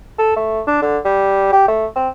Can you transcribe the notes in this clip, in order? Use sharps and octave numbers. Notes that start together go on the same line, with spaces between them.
A4
A3
D4
D3
G3
G4
A3
C4